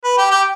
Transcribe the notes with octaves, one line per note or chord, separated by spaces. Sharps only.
B4
G4
G4